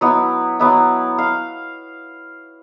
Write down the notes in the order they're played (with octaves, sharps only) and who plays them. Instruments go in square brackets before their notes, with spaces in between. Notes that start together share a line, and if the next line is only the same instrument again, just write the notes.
[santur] F#3 B3 E4
F#3 B3 E4
F5